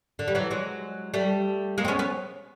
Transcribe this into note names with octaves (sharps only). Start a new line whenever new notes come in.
D3
G3
E3 F#3
F#3 G#3
G3 A3
G#3 A#3
C4
B3 C#4
B3 C#4